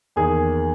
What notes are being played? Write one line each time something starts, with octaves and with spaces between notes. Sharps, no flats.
E2 D#3 A#3 G#4